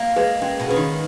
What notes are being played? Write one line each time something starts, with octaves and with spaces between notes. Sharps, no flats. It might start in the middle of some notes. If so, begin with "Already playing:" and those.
Already playing: A#3
G#3 G#4 B4
G#3 C#4
B2
C#3 G#4 B4
D#3